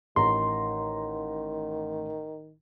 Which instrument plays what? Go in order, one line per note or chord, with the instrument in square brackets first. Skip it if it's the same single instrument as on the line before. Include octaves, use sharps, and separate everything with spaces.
[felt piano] A1 A#5 [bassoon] D#3 [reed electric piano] C6